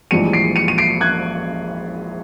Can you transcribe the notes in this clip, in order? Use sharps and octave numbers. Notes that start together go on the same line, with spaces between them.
A#1 G#2 E3 G3 C#7 D#7
C7 D7
C#7 D#7
D#7
C7 D7
F#6 G#6